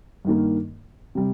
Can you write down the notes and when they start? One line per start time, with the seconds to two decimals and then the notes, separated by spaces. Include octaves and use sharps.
0.25 G2 D#3 A#3
1.15 C3 G3